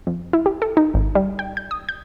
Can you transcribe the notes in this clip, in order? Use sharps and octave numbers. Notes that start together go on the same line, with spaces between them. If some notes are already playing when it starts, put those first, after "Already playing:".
F2
E4
G4
A4
D#4
G#1
G3
G5
G6
D#6
G6